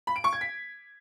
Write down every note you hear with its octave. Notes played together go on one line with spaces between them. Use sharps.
B5
D7
C#6
G#6
B6